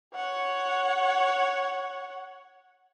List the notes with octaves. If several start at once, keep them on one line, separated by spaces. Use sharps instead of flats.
C#5 F#5